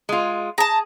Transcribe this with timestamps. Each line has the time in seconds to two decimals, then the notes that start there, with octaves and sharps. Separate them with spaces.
0.09 G#3 F4
0.58 G#4 A5 A#5